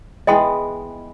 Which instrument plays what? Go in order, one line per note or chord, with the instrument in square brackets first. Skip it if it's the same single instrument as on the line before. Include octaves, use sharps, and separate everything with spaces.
[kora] E3 G#3 B3 [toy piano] D#5 G5 C6